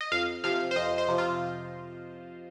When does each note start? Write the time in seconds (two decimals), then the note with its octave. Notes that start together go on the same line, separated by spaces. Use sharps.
0.01 D#5
0.12 F2 F5
0.44 C3 F3 F5
0.71 C5
0.76 F2 D#5
0.98 C5
1.08 C3 F3
1.18 F4